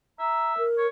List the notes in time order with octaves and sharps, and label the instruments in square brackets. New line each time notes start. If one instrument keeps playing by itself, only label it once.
[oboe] E5 [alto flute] A#5
[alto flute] A#4
[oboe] C#5